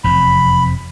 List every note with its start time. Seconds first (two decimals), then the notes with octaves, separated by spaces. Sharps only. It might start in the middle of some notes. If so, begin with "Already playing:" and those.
0.04 F1 E2 C3 B5